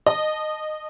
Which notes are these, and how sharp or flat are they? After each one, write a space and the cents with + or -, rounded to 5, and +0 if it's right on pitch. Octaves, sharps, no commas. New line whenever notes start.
D#5 -15 A5 -10